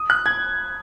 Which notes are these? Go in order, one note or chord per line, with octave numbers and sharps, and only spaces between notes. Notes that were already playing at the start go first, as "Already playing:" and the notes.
Already playing: D#6
F#6
G#6